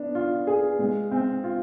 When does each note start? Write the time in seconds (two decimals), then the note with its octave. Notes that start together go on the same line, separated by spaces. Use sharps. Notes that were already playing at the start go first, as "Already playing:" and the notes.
Already playing: B3 D4
0.15 F4
0.47 G#4
0.79 G#3
1.11 C4
1.44 F4